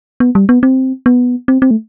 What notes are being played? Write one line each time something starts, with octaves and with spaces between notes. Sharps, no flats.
B3
G3
B3
C4
B3
C4
C4
A3